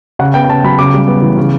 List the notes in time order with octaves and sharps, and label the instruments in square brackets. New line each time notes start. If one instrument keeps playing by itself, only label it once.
[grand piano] C#3 F#5
B3 G5
G5
C#3 A5
F#3 B5
C#3 D6
G3
B3
E3
C#3